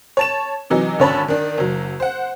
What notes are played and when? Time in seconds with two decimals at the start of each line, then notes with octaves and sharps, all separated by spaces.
0.17 C#5 A5 E7
0.70 C3 E3 F#3 D#4
0.99 G#1 D3 C#4 C#5 A5 B5
1.28 D#3 D4
1.58 F#1 F#3
2.00 C5 F#5